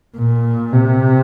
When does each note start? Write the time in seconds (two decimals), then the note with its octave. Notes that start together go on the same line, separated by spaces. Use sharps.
0.17 A#2
0.73 C3